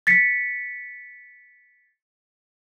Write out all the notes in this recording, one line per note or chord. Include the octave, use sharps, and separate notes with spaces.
A6 B6 C#7